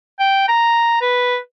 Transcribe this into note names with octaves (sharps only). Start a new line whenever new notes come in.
G5
A#5
B4